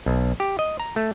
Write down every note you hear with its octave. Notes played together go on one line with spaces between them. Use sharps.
B1
G4
D#5
A#5
A3